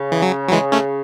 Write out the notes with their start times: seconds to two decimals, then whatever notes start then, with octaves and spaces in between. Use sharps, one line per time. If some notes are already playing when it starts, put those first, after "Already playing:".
Already playing: C#3
0.12 E3
0.22 F#3
0.48 F#3
0.52 E3 G#3
0.72 A3 C#4